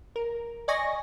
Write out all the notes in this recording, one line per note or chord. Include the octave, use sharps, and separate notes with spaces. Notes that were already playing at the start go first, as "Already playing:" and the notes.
A#4
D5 D#5 G#5 C#6 A#6